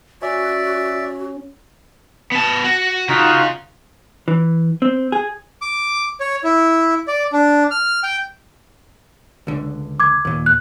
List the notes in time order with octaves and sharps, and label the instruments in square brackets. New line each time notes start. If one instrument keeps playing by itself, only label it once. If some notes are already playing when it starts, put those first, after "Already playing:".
[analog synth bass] C#4 [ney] F#4 [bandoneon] D5 E5
[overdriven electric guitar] B3 A5
F#4
[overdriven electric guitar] C#3 [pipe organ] D#4 F4 F#4
[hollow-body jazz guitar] E3
C4
G#4
[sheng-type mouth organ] D6
C#5
E4
D5
D4
F6
G5
[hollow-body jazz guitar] C#2 D3
[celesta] D6 G#6
[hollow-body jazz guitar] D#2 A#2
[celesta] F#6